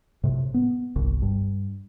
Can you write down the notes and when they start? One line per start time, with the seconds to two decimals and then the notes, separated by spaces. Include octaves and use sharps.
0.24 A2 C3
0.54 B3
0.96 G1 C2
1.22 G2